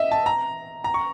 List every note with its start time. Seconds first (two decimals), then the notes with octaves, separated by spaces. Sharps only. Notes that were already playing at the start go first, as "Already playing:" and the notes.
Already playing: D#5 E5
0.11 A5
0.26 A#5
0.84 A#5
0.94 C#6